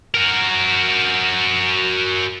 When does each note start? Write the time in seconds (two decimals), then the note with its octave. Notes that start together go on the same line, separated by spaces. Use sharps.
0.14 F#4 A#4